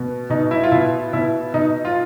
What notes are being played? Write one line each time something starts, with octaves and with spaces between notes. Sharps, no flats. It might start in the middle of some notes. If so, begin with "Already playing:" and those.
Already playing: B2
B2 D#4
E4
F4
B2 E4
B2 E4
B2 D#4
F4